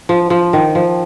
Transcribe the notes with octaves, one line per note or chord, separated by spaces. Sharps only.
F3
F3
D#3
F3